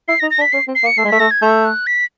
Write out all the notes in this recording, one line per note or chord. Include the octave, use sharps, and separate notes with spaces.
E4 C7
A#6
D#4
A#6
D4
B6
C#4 C7
C4
C7
A#3
C#7
A3 C7
G#3
A3 B6
A3 A#6
G#6
A3 G6
F#6
B6